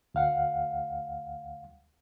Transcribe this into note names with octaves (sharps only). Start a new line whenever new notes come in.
D2 F5 F#5